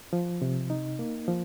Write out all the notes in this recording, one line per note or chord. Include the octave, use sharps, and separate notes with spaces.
F3
C3
D#4
A#3
F3